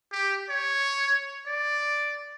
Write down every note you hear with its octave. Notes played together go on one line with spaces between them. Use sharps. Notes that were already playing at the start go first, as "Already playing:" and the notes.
G4
C#5
D5